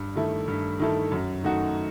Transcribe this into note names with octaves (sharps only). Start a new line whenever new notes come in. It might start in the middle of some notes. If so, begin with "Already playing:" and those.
Already playing: G2
D#3 A3 E4 A4
G2
D#3 A3 E4 A4
F#2
D#3 A3 D#4 F#4